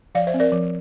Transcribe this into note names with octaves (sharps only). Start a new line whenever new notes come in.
F3 D5 F5
C5 E5
C4
A#4 D5
F3